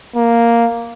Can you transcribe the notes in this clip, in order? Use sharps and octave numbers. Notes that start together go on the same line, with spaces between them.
A#3